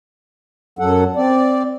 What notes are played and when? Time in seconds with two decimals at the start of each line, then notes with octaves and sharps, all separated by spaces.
0.79 F#2 F#3 A4 F#5
1.16 C4 D5